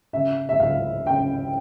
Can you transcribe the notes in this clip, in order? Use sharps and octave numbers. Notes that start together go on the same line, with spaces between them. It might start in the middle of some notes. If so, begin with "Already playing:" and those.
C#3 E5
E5
C#2 F5
C#3 G5